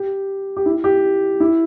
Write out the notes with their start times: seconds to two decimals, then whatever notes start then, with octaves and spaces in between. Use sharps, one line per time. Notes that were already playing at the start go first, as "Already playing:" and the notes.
Already playing: G4
0.57 G4
0.66 E4
0.84 G4
1.40 E4